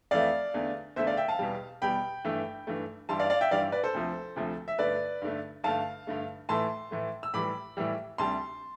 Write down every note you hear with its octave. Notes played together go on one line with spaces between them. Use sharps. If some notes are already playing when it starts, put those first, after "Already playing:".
F2 E3 A3 D5 F5
E2 D3 A3
E2 D3 A3 C5 E5
D5 F5
E5 G5
F5 A5
E2 B2 G3
E2 B2 G3 G5 B5
G2 E3 A3
G2 E3 A3
G2 E3 G3 A5 C6
D5 F5
D5 F5
E5 G5
G2 E3 G3 D5 F5
B4 D5
A4 C5
D2 C3 F3 A3
D2 C3 F3 A3
E5
G2 D3 A3 B4 D5
G2 D3 A3
G2 D3 A3 F5 A5
G2 D3 A3
A2 E3 A3 A5 C6
A2 E3 A3
E6
A2 E3 G3 B5 D6
A2 E3 G3
D2 C3 G3 A5 C6